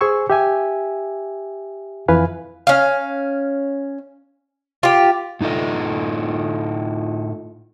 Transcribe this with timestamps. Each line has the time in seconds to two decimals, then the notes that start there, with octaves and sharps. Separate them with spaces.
0.01 G#4 C5 G#5 C#6 E6
0.30 G4 E5 G#5
2.08 F2 E3 B4 F5 G#5
2.67 C#4 F5
4.83 F4 G4
5.41 A2 D#4 F4 A4 D#5